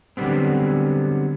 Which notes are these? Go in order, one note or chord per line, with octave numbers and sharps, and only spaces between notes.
D3 F#3 G3 B3 C4